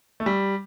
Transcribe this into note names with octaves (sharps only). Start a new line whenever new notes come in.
A3
G3